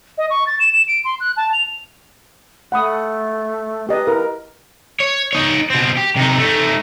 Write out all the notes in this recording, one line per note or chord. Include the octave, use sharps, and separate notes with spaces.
D#5
C#6
A6
E7
E7
D7
C6
F#6
A5
F7
A3 F#5 B5 D#6
G4 B4 D#5
E4 A#4
C#5
D#4 C#5
B2 C4
G4
C3 D#4
A3 D#4